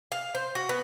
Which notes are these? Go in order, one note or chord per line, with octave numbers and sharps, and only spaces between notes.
F5
C5
F#4
B3